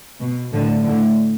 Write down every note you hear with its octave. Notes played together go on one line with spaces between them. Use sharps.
B2
A2 D3
A2 D3